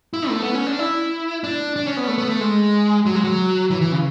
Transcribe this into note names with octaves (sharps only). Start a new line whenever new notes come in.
E4
A3
B3
C#4
D4
E4
D4
D4
C#4
B3
A3
B3
A3
G#3
F#3
G#3
F#3
E3
E3
C#3